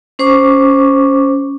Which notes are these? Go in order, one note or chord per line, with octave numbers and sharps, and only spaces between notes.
C#4 C5 C#6 D6